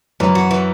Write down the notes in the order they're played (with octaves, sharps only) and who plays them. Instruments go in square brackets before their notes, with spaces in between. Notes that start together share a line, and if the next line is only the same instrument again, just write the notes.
[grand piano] F#2 [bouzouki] E3
[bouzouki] F#4
E3